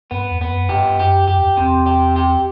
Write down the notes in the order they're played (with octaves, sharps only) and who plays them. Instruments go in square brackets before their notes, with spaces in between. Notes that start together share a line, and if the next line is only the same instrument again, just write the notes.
[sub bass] G2 [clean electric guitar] B3
[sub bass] E2
[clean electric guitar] B3
[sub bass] F#2
[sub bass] G2 [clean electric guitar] G4
[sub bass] F#2 [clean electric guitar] G4
[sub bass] F#2 [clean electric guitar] G4
[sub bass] E2
[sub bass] E2 [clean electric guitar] C3
[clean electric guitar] G4
G4